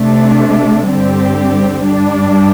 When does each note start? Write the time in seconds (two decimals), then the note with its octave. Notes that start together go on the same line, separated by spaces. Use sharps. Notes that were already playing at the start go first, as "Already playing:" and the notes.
Already playing: C3 A3 D4
0.89 G2 D3 G3 C4 G4
1.85 G2 G3 D4